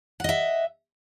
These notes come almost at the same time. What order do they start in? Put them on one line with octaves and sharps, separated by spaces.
F#5 D#5 E5